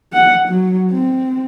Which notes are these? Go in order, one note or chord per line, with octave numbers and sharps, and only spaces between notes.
F#5
F#3
C4